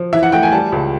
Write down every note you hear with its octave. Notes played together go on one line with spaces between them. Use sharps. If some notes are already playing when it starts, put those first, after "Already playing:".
Already playing: F3
E3 E5
F#5
A3 G5
G#5
G3 A5
C#2